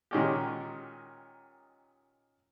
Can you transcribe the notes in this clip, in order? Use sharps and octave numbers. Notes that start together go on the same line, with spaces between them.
A#2 D#3 G#3 C#4 F#4 G4